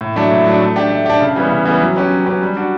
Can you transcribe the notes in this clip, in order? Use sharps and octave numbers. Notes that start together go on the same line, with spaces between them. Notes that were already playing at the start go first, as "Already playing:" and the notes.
A2
F#3 A3 D4
A2
F#3 A3 D4
A3
D4 G4
A3
D4 G4
C#3
E3 G3 B3
C#3
E3 G3 B3
F#3
C#4 G4 B4
F#3
C#4 G4 B4
G3
D4 F#4